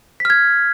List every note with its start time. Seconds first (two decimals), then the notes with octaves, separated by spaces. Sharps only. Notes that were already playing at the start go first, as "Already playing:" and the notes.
0.20 B6
0.25 F6
0.30 G#6